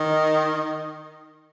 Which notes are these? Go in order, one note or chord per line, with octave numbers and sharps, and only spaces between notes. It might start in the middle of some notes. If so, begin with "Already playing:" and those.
Already playing: D#3